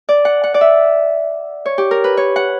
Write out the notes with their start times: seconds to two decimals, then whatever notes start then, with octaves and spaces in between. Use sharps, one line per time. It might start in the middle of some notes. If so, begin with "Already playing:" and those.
0.09 D5
0.25 F#5
0.44 F#5
0.54 D5
0.61 E5
1.66 C#5
1.78 G4
1.91 A#4
2.04 B4
2.17 C#5
2.36 F#5